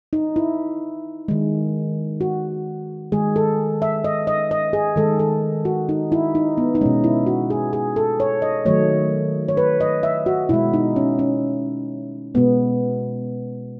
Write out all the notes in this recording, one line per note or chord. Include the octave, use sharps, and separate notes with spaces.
D#4
E4
D#3 G#3
F#4
D#3 G#3 G#4
A4
E5
D#5
D#5
D#5
G#4
D#3 G#3 A4
A4
F#4
D#4
E4
D#4
B3
D#4
B2 G#3 C#4
E4
F#4
G#4
G#4
A4
C#5
D#5
D#3 F#3 A3 C#5
C#5
B4
D#5
E5
F#4
B2 G#3 E4
D#4
C#4
C#4
B2 G#3 B3